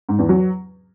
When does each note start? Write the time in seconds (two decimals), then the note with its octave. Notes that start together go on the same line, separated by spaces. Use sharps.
0.09 G#2
0.19 E2
0.29 F#3